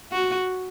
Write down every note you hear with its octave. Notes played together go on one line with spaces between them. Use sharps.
F#4